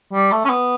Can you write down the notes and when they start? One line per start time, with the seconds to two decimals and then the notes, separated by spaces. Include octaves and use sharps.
0.13 G3
0.32 A3
0.45 C#4
0.49 B3